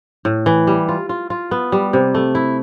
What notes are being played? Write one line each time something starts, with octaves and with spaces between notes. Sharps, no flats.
A2
E3
G3
F4
F4
F4
B3
G3
C3
A3
E4